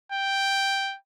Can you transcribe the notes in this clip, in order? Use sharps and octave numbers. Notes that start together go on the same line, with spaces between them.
G5